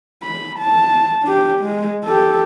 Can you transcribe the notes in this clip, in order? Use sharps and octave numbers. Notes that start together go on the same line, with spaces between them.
B5
A5
D4 G4
G#3
G4 A4